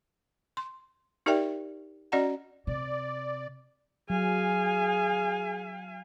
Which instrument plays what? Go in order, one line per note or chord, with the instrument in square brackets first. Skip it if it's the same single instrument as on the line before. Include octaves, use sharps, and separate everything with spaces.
[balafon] C6
D#4 G4 A#4 D5 E5 G5
C#4 F#4 D5 D#5 F#5 A#5
[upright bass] C3 [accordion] D5
[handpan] F#3 [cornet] G#4 [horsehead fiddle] F5 G#5